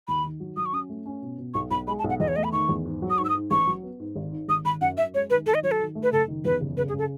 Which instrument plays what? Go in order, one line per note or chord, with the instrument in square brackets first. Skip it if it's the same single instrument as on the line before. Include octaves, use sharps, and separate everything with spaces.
[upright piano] D#2 [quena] B5
[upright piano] D#3
F#3
[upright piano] F#3 [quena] D#6
[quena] C#6
[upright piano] C#4 [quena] D#6
[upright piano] A3
C#4
B2
B2
[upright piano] B1 [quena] C#6
[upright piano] B1 [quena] B5
[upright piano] G#3 [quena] B5
[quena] A5
[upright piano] B1
[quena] F#5
[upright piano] E2 [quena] D#5
[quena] C#5
[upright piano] A3 [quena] D#5
[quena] B5
[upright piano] D#3 [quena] C#6
[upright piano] E2
G#2
F#3
[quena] D#6
[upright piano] G#2 [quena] C#6
[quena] E6
D#6
[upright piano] G#2
[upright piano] A1 [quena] C#6
[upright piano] F#3
B3
G#2
G#1
G#2
[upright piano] G#1 [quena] D#6
[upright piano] G#1 [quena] B5
[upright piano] F#2 [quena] F#5
[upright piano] F#2 [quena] E5
[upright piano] G#3 [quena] C#5
[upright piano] D#3 [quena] B4
[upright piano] D#3 [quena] A4
[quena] D#5
[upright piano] F#3 [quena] C#5
[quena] A4
[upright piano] D#3
A3
[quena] B4
[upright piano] F#1 [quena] A4
[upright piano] D#3
[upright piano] E2 [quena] B4
[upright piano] F#1
[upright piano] C#3 [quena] B4
[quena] G#4
[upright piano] C#3 [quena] A4